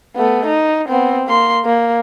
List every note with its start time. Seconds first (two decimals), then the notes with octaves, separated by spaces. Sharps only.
0.16 A3 B3
0.46 D#4
0.89 B3 C4
1.27 A#3 C6
1.65 A#3